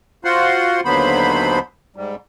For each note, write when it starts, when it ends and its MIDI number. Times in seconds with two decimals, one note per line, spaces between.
0.24 0.80 65
0.24 0.80 66
0.24 0.80 72
0.24 0.80 78
0.24 0.80 84
0.85 1.59 39
0.85 1.59 50
0.85 1.59 54
0.85 1.59 59
0.85 1.59 72
0.85 1.59 83
1.96 2.15 44
1.96 2.15 55